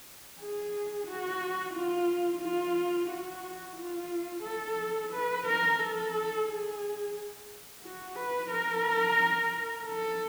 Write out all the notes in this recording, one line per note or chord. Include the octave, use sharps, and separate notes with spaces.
G#4
F#4
F4
F4
F#4
F4
A4
B4
A#4
A4
G#4
F#4
B4
A#4
A4